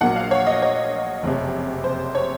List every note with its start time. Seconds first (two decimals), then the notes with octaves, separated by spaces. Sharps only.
0.01 A#1 A#2 F#3 A#3 F#5
0.16 F5
0.31 C#5
0.47 D#5
0.62 C#5
1.23 F#1 F2 C3
1.84 C5
2.15 C#5